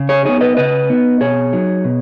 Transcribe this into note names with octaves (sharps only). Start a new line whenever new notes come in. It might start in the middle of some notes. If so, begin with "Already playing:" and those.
Already playing: C#3
G#4 C#5
B3 D#4 G#4 C#5
B4 D#5
C#3 B4 D#5
B3 D#4
B2 G#4 C#5
F#3 D#4
B2